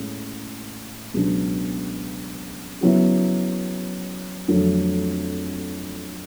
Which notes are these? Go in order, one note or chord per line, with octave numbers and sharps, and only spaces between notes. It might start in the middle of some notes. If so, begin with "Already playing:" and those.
Already playing: A2 G#3 C#4
C#2 B2 F#3 B3 D4
C#3 F#3 B3 E4
F2 D3 F#3 A3